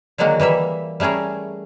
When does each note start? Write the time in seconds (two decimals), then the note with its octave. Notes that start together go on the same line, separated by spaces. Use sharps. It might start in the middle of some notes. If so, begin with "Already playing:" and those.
0.18 D3 D#3 F#3 G#3 A#3 F#4
0.40 E3 G3 A#3 E5
1.00 G3 A3 C#4 G#4 A#4